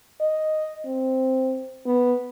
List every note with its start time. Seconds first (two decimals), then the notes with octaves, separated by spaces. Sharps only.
0.21 D#5
0.86 C4
1.86 B3